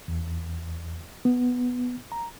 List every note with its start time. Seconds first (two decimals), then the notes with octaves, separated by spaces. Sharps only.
0.08 E2
1.25 B3
2.12 A#5